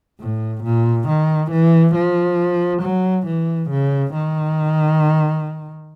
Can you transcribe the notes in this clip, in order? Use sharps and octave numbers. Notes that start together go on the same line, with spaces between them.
A2
A#2
D#3
E3
F3
F#3
E3
C#3
D#3